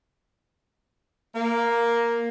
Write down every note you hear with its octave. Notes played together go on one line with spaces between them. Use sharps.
A#3